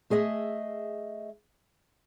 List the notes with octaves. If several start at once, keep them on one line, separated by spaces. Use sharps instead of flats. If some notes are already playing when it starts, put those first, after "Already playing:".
A3 G#4 D#5 E5